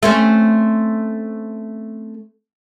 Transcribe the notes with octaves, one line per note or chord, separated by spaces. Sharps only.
A3 C4 C#4